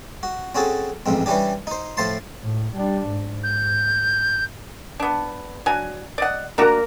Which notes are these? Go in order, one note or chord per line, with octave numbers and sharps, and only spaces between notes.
F#4
C4 C#4 F#4 G#4 A4
A1 F2 G#2 C4
E3 G3 C#4 D4 G4
D#4 C5
A2 F3 C5 A5 C6
A2
G3 D4
G#2
G6
B3 D4
F#3 D4 G#5
D5 D#5 F#5
A#3 D4 F#4 A#4 A#5